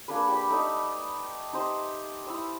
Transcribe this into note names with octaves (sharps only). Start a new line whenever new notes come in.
A#3 D4 G#4 B4
G4 D5 B5
A3 D#4 D5 D#6
D#4 G4 C5 D#5
E4 D#6 E6